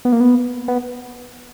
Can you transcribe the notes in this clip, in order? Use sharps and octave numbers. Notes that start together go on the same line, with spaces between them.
B3
A#3
B3
B3